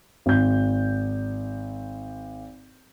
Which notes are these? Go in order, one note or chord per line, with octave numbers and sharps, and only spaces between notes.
G#1 G6